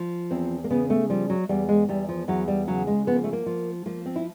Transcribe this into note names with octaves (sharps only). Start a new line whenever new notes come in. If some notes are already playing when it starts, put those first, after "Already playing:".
Already playing: F3
E2 C4
A#3
C#3 B3
A3
F3 G3
F#3
E2 G3
G#3
E2 G3
F3
E2 F#3
G3
C#3 F#3
G#3
F3 B3
A#3
A3
A#3
F3
F3 A#3
C4
E4